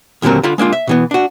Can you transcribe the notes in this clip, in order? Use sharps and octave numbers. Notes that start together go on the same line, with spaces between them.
D#2 A#2 D3 F#3 C4 A#4
D3 F4 B5
G#3 A#3 D4 F4
E5
B2 E3 B3
D4 F#4